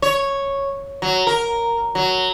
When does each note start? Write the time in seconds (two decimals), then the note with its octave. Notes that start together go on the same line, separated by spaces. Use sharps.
0.02 C#5
1.02 F#3
1.27 A#4
1.95 F#3